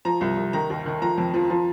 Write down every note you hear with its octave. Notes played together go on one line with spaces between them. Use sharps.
F3 A#5
C2
C2
D#3 A#5
D#2
D#3
F3 A#5
F2
F3
F3